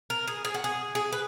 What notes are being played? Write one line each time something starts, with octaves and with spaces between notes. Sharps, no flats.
A#4
G#4
G#4
F#4
G#4
G#4
B4